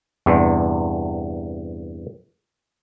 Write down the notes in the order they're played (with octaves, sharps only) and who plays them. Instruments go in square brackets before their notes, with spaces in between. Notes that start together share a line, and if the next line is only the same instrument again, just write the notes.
[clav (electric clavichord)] E2 G2 C3